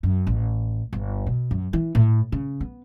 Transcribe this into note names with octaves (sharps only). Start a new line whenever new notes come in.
F#2
A1
G1
B2
F#2
E3
A2
C#3
B3